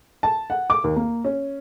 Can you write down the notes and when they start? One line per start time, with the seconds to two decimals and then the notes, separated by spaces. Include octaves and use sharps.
0.23 A5
0.50 F#5
0.70 D6
0.84 D#2
0.96 A#3
1.24 C#4